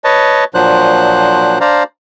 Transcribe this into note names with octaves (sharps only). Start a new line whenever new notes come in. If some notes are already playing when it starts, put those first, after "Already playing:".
B4 C#5 D#5 A5
A#2 F3 F#3 D4 C5 F#6
D4 C5 D5 F5 A#5